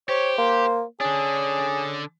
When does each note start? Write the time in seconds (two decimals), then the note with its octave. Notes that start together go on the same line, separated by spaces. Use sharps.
0.09 G4 C5 C#5
0.38 A#3 C5
1.01 D3 C#4 D4 G#4